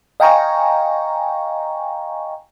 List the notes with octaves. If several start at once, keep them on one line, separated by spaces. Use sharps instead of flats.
D#5 F5 G5 G#5 A#5 C#6